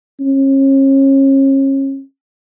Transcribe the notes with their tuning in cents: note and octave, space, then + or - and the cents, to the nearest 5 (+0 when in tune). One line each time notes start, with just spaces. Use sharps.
C#4 -35